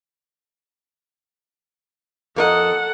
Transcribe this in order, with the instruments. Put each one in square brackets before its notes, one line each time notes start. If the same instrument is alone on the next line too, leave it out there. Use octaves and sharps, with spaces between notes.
[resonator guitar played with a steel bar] F2 A#4 D#5 [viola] A4 F#5